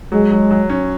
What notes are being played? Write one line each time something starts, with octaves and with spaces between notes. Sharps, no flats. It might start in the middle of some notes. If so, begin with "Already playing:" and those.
F#3 G#3
F#3
F#3
C#4